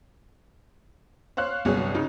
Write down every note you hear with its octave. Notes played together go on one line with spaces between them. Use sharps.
C5 C#5 F5 F#6
G1 C2 F#3 G#4 C#5
C#3 D#4